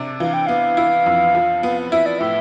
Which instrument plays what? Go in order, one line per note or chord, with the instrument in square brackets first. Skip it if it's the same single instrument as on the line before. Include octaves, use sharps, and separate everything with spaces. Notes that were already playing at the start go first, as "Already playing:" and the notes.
Already playing: [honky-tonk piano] C3 D4
[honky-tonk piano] E3 [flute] F5
[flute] G5
[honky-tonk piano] B3 [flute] F5
[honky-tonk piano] E4
F2
F3
B3
[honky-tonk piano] E4 [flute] E5
[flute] D5
[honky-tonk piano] A2 [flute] E5